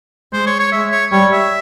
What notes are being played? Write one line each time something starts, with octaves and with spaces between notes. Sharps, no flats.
G#3 C5
C#5
C#5
G#3 E5
C#5
G3 C#5
E5